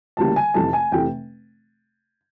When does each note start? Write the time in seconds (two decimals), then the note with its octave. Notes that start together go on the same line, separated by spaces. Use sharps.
0.17 D2 C#3 E3 G3 A#3 A5
0.36 G#5
0.54 F1 F2 C3 E3 A3 A5
0.73 G#5
0.91 F1 C3 E3 A3 G5